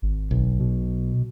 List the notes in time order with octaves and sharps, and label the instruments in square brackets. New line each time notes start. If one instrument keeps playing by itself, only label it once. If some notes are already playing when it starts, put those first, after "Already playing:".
[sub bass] G#1
[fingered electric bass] B1
[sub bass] B2